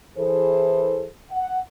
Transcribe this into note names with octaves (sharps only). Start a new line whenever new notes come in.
E3 G#4 A4 C5
F#5